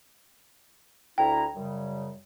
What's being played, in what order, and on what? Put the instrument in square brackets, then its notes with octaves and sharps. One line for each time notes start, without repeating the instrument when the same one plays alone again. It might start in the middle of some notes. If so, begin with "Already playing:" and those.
[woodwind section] D2 E4 A#5 [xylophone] G5
[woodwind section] F#2 C#3 G3